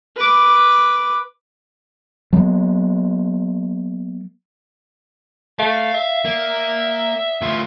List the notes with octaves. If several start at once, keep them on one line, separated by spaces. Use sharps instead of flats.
B4 D6
F#3 G#3 A#3 B3
A3 F5
E5
A#3
A2 F4